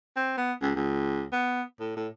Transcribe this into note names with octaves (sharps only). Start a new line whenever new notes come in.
C4
B3
C#2
C#2
B3
A2
A2